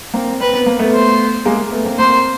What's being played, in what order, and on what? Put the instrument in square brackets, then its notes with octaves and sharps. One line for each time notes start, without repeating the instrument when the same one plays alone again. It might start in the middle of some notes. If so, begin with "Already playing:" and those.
[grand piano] A#3 C4
[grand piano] C4 [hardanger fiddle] B4
[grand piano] B3
A#3
A3 B3
[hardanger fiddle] C5
[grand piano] G#3 A#3
A3 B3
A#3 C4
[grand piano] A#3 C4 [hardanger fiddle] C5